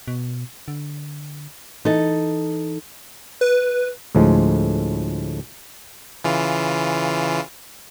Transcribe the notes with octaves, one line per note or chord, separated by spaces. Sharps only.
B2
D3
E3 D#4 A4
B4
D2 A2 F3 G#3
C#3 E3 F4